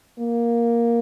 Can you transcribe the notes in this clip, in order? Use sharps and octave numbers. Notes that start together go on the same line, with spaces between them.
A#3